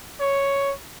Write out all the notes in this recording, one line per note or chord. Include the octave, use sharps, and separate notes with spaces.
C#5